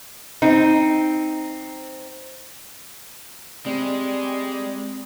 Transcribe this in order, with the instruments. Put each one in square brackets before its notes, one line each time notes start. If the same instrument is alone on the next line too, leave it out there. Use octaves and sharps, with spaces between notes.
[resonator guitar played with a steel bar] C4 D#4
[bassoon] G3 [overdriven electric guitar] G#3 [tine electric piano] C4 [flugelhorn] D5